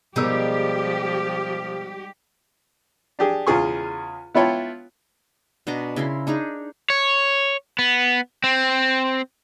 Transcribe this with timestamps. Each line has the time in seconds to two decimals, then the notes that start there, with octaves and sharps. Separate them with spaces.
0.16 B2 F3 G3 G#3 D#4 G4 A#4 E6
3.19 D4 G4 G#4
3.47 E2 C#3 F4 G#4 C#6
4.35 B3 E4 F4 C#5 G5 A5
5.67 B2 D4 D#5 A#5
5.96 C#3 E4 A#4 C6
6.27 D4 D#4 G#4 A#5
6.90 C#5
7.79 B3
8.44 C4